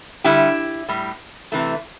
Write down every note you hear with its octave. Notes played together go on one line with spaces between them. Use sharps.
D3 G3 E4 G4
A2 G3
C3 E3 A3